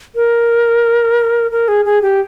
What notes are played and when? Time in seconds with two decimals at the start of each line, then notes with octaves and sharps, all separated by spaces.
0.15 A#4
1.51 A#4
1.68 G#4
1.85 G#4
2.02 G4